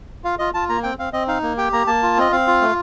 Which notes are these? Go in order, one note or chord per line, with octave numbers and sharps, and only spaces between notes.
F4 F5
F4 D#5
F4 A5
A#3 A#5
C4 G5
C4 F5
C4 D#5
D#4 F5
A#3
G4 G5
A#3 A#5
A#3 A5
F4
C4 D#5
C4 F5
F4
A3